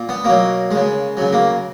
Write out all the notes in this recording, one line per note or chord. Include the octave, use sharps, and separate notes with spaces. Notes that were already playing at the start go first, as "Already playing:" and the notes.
Already playing: A#2
B3
B2 F#3 A#3
C#3 G#3
C#3 F#3
A#3